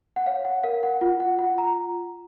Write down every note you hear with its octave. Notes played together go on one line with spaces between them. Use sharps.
F#5
C#5 F5
F#5
A#4 F5
F#5
F4 F#5
F#5
F4 F#5
A#5